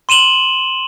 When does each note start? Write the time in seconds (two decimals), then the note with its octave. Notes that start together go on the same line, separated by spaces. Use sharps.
0.09 C6 D#7 E7 F#7 G7